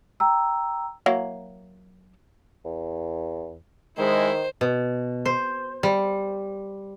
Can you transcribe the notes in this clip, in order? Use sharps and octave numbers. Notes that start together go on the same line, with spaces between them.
G5 A#5 E6
F#3 A#3 E4
E2
D#3 G#3 E4 C5
B2
C5
G3